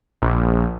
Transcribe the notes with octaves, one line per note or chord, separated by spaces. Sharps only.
A#1